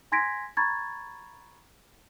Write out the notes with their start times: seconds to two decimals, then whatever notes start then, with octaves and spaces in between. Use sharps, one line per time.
0.12 G#5 C6 G#6 A#6 B6 D7
0.57 A#5 B5 C#6 G#6 A6